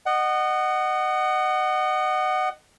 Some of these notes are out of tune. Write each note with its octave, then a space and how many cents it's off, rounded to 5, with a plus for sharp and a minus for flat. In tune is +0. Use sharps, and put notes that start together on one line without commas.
D#5 -25 F#5 +15